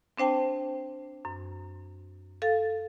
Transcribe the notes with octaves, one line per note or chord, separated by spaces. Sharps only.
C4 D4 C5 G5 A5
F#2
A4 F5 A6